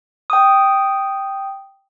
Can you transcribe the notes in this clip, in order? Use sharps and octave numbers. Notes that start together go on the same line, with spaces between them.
G5 D#6